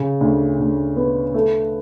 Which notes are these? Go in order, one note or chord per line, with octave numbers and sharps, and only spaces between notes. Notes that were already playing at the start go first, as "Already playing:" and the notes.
Already playing: C#3
D2
D2
B3
A3